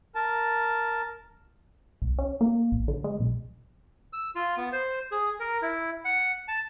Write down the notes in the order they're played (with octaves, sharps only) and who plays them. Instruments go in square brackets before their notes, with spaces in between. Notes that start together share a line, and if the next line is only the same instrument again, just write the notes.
[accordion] A#4 A5
[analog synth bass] C2
C#4
A#3
A#1
D3
G#3
B1
[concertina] E6
F4
B3
C5
G#4
A#4
E4
F#5
A5